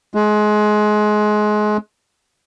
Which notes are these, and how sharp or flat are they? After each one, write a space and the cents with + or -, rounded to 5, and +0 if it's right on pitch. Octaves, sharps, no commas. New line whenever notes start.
G#3 +25